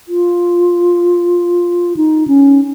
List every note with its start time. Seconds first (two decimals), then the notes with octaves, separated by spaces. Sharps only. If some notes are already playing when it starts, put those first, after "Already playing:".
0.08 F4
1.97 D#4
2.28 C#4